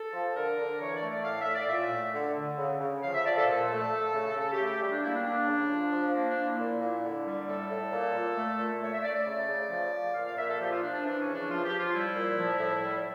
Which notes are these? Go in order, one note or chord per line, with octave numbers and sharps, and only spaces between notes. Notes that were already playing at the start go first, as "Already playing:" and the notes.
Already playing: A4
F3
D3 A#4
D3
E3 C#5
D5
A3
D5
A2 F5
E5
A2
D5
A#2 E5
A3
D3
D3
C#3
C#3
F3 F5
E5
F3 D5
A4
A#2 A4
A3
A3
C#3
C#3 A4
G4
A3
G4
G3 G4
D4
A#3 E4
D4
G3 D4
C#3
F3
F3
A#3
D4
A#3
E4
A#2
A#2
D3
G3
A2 A4
A2
A#2
A#2
A3
A#2
A3 C#5
E5
A3 D5
D5
C#3
C#3
F3
F3
A#2 F5
F5
A#2 E5
A4
F3 G4
F4
F3 D4
D4
E3 D4
C#4
C#3
D4
F3 F4
G4
F3
F4
G3 E4
A#2
F3
A2
G3